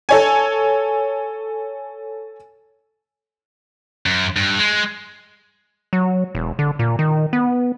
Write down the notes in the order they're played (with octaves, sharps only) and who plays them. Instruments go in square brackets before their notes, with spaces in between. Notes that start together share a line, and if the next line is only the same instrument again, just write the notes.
[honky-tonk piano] A4 C#5 G#5
[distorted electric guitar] F#2
G2
G#3
[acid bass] F#3
E1
D3
A#2
D#3
B3